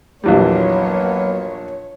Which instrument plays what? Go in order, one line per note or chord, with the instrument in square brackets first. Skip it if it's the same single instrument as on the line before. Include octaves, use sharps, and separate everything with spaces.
[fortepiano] A#1 E2 G3 [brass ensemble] F#3 A#3 B3 [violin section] C#5